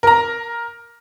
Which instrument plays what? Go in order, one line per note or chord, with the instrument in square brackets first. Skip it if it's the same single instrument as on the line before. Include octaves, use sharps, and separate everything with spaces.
[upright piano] A#4 A#5